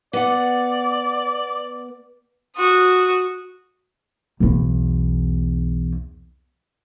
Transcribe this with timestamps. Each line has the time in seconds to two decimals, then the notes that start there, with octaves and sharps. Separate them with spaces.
0.13 B3 D5 F#5
2.57 F#4 D#6
4.40 B1 E2